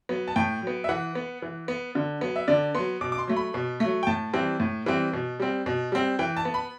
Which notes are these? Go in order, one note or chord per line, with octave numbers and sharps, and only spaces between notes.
F#3 B3
A5
A2 G5
F#3 B3
E5
E3 F#5
B3
E3
B3
D3
F#3 B3
E5
D3 D5
F#3 B3 C6
B2 D6
D6
C6
F#3 A3
B5
B2
F#3 A3
G5
A2 A5
E3 G3 C4
A2
E3 G3 C4
B2
G3 C4
B2
G3 C4
E3 G5
A5
B3
B5